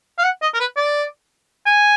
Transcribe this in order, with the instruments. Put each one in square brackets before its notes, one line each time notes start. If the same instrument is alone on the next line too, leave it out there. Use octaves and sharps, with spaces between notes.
[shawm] F5
F#5
D#5
A#4
B4
D5
G#5